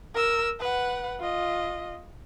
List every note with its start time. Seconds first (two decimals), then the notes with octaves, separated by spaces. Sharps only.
0.14 A#4 E6
0.60 B4 F#5
1.20 F4 D#5